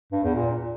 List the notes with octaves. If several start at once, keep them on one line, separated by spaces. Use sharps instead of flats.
G2
E2
A#2